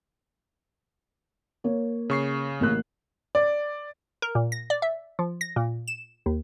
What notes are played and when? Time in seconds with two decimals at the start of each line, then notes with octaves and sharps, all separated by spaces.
1.64 A#3 C#5
2.10 C#3 C#6 C7
2.60 A1 A#3 F#6
3.35 D5
4.22 A#4
4.35 A#2
4.52 A#6
4.70 D5
4.82 E5
5.19 F3
5.41 A#6
5.56 A#2
5.88 E7
6.26 D#2